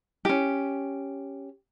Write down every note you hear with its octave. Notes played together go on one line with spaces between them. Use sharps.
C#4 G4